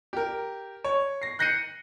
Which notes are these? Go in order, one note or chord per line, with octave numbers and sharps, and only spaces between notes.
G4 A#4
C#5
A#6 C7
F#6 G6 A#6 C7 C#7 D#7